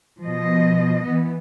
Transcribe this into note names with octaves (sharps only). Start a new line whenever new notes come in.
B2 F3 D#5
E3 B3